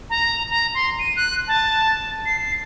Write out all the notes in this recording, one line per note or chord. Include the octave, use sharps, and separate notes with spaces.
A#5
A#5
C6
D#7
F#6
A5
C7